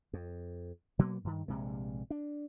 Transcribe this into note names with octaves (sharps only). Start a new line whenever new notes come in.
F2
B2 F#3 A#3 B3
G2 D#3
A#1 G2 C3 G#3
D4